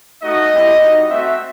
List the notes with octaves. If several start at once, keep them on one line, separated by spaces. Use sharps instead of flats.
A3 D#4 F#4 D#5
G3 C4 E4 G4
G3 D#4 F#4
A3 C4 F#4 E5